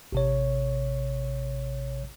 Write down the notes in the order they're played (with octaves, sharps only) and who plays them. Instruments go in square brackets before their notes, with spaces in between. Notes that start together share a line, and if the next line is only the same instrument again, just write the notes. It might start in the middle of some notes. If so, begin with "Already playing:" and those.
[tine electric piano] A1 C3 C#5